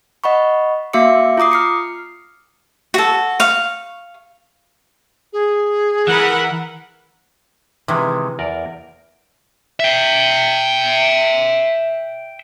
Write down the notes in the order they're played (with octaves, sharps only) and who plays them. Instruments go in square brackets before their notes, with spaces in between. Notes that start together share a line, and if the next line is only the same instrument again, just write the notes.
[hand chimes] D#5 F#5 B5 C#6
A#3 F#4 E5 F5 D6 C#7
F4 A#5 D6 D#6 C7
F6 C7 C#7
[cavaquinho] F#4 A4
F5 C#6
[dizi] G#4
[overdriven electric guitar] E3 [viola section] A#4 F#5 B5
[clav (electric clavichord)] C3 D#3 G#3 [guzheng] E3
[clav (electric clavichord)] E2 A#4 D5
[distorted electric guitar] E5 G5